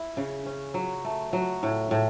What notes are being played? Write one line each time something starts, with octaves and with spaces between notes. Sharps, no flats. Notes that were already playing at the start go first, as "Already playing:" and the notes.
Already playing: E4
C#3
C#4
F#3
A3
F#3
A2
A2